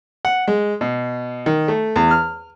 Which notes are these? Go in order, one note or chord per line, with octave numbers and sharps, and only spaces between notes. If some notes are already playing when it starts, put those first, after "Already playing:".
F#5
G#3
B2
D#3
A3
E2
F6